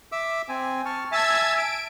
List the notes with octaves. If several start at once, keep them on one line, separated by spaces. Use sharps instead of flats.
E5 D6 E6
C4 G#5
A5 C#6 F6
E5 G#5 A5 E6 G#6
D7